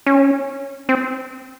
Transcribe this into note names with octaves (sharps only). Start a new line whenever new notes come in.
C#4
C4